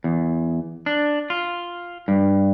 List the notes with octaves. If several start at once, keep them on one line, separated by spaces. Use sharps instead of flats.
E2
D4
F4
G2